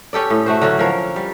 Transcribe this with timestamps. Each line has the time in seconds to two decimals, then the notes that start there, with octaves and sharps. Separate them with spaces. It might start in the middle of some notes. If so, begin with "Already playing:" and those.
0.13 C#4 G4 A4 D5
0.30 A2
0.46 A3 F#4 C5
0.62 D3 F#3 C#4
0.79 F3 A#4 C#5
1.16 G3